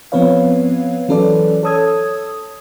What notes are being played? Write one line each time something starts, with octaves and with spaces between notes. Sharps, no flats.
F3 B3 C4 B4 C#5 F5
E3 F#3 C#4 A4 B4 D5
A4 C#5 A5 D#6 E6 G#6